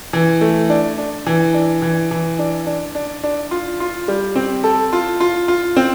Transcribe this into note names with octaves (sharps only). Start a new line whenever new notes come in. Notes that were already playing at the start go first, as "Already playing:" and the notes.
E3
A3
D4
D4
E3
D4
E3
E3
D4
D4
D4
D4
F4
F4
G3
C4
A4
F4
F4
F4
C4